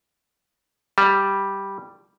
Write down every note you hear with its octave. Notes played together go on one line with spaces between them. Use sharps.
G3